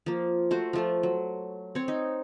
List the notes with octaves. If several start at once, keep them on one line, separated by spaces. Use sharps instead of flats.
F3 A#3
A3 F#4 C5
F3 A3 F4
F#3
C4 C#5
D#4